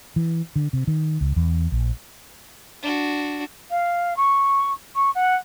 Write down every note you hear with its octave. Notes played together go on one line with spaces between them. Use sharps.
E3
D3
C3
D#3
C#2
E2
A#1
D4 F#4
F5
C#6
C#6
F#5